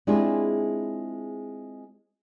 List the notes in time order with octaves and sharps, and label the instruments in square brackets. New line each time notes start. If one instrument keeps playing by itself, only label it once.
[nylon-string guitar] G#3 C4 D4 E4 F4 G#4